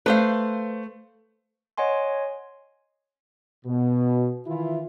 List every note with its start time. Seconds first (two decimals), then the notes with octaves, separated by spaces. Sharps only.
0.06 A3 B4 C5 F5
1.78 C#5 D#5 F#5 G#5 C6
3.66 B2
4.47 D#3 E3 E4 F4